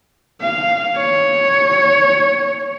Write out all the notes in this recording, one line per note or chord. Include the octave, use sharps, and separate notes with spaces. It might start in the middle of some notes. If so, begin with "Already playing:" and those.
F5
C#5